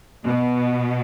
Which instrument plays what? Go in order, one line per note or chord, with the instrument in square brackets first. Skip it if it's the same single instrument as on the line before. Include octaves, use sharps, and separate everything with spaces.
[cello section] B2